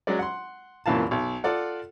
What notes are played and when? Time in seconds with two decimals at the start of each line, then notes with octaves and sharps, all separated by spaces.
0.07 F#3 G#3 C#4 D5
0.19 F#5 C6
0.86 C2 F#2 A#2 E3 F5 A5
1.11 B1
1.44 F4 A4 D5 F#5